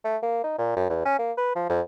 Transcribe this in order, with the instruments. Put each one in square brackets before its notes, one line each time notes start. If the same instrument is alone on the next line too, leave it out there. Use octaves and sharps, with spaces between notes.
[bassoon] A3
A#3
D#4
A#2
F#2
E2
C#4
A#3
B4
F3
F2